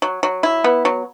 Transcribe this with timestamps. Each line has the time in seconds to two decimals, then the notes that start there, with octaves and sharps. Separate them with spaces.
0.02 F#3
0.23 F#3
0.43 E4
0.64 B3
0.85 F#3